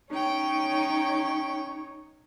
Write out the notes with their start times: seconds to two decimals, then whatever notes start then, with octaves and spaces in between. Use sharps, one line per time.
0.10 C#4 D#4 C#5 G5